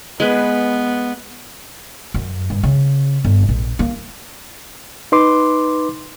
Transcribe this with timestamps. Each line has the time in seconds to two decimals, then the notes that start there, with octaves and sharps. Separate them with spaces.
0.20 G#3 B3 B4
2.14 F#2
2.50 G2
2.63 C#3
3.24 G1
3.49 A#1
3.79 A#3
5.12 D#4 B4 C6 D6